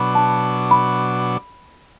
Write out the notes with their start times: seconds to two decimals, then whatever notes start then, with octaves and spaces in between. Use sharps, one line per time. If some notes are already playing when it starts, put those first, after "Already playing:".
Already playing: B2 F#3 D4 B5
0.15 A5
0.71 B5